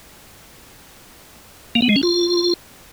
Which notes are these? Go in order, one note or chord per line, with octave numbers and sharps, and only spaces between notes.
A#3
B3
G#3
C#4
F4